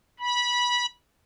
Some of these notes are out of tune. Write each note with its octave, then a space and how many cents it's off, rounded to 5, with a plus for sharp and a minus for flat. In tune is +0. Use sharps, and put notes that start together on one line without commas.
B5 -20